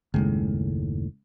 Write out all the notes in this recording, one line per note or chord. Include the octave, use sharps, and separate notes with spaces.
F#1 D#2 A2 C#3 G#3